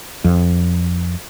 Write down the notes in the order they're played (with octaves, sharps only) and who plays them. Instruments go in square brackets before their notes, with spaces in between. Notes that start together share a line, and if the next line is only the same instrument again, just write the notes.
[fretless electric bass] F2